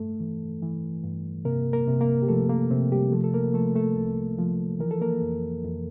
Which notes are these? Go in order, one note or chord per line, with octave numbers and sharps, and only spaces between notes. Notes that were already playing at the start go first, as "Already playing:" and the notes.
Already playing: G2 A3 A4
E3
E3
G2
C3 A#3 A#4
A#3 A#4
C3
A#3 A#4
G4
F3 A3 A4
A#3
C3 C4
G3 G4
F3 A3 A4
A4
A#3 A#4
F3 A3 A4
A3 A4
C2
F3
E3 A#4
A4
A#3 A#4
F2
F2